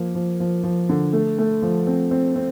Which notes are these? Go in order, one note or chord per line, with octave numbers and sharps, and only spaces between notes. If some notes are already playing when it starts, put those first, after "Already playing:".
Already playing: F3 A#3
F3
F3
F3
D3
A3
A3
F3
C4
C4
C4